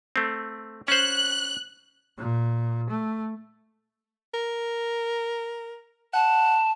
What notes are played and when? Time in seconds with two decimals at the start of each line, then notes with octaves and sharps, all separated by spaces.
0.16 A3 C4
0.88 C#4 C5 F#6
2.18 A#2
2.90 A3
4.34 A#4
6.14 F#5 A5